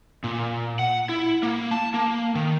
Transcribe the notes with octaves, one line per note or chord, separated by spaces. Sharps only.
A#2
F#5
E4
A#3
A5
A#3
D#3